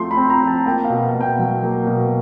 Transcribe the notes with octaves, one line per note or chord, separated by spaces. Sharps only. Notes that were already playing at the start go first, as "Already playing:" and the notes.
Already playing: F3 A3 C4 F4 C6
B5
C4
A#5
F3
A5
A#3 G5
F5
B2
B2
G5
F#3
A#3
B2